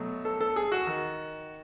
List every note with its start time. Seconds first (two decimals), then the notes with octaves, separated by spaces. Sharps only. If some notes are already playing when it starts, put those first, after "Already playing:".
Already playing: B2 F#3 A3
0.25 A4
0.41 A4
0.56 G#4
0.72 F#4
0.87 D#3